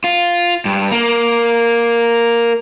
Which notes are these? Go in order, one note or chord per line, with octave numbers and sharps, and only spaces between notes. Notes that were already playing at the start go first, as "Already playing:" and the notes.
F4
G2
A#3